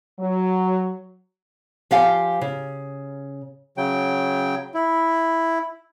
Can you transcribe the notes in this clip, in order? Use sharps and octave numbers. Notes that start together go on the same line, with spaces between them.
F#3
F3 G4 F5 G#5
C#3
C#3 F#3 G5
E4